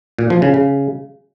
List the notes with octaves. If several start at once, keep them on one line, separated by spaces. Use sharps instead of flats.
A#2
F3
C#3
C#3